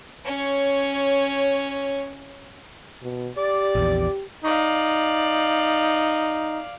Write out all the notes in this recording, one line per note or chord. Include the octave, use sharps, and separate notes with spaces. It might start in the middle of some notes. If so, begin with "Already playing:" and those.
C#4 C#5
B2
G4 D5
A#1 E2
D#4 D5 F5